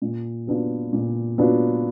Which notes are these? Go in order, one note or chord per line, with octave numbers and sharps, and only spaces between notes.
A#2
F#3 B3 D4 F4
A#2
F#3 B3 D4 F4